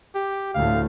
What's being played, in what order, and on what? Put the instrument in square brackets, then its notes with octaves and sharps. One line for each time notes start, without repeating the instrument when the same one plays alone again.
[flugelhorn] G4
[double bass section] D2 A2 A3 [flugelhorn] F5